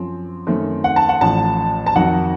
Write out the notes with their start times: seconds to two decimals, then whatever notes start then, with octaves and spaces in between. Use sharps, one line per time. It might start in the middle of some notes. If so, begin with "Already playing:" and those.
Already playing: F#2 F3 C4
0.47 F#2 D#3 A3 C4
0.84 F#5
0.96 A5
1.09 F#5
1.21 A1 A2 F3 A5
1.86 A5
1.95 F2 D#3 F#3 F#5